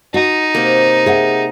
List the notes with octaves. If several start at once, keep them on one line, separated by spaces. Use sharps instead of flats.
D#4 F#4
C3 A#3
G#4 E5 F#5